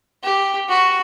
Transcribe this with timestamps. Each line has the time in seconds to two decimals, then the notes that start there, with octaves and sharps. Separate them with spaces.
0.24 G4
0.69 F#4